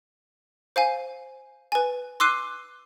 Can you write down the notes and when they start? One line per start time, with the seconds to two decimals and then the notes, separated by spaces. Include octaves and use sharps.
0.76 C5 F5 G#5
1.72 B4 G#5
2.20 C6 D6 E6 F#6 C7 D#7